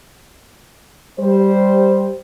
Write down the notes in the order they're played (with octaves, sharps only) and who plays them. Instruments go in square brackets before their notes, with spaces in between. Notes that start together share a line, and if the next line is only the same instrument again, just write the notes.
[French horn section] G3 C5